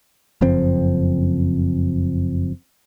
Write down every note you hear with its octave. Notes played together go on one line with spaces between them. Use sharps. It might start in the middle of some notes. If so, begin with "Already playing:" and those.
F#1 F2 C4